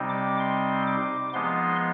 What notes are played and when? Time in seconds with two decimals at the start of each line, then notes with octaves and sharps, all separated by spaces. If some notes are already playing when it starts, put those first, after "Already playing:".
Already playing: C3 G3 C4 D#4
0.09 D6
0.40 C6
0.87 D6
1.33 F3 G#3 B3 D#4 C6